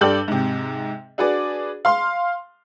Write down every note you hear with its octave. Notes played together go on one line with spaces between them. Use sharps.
G2 G4 A4 D5 G6 F#7
G#2 C3
D4 F#4 G#4 B4 D5
F5 C6